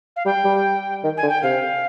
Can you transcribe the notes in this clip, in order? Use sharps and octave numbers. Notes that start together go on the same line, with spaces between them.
F5
G3 G5
G3
D#3
G#5
D3
G5
C3 F5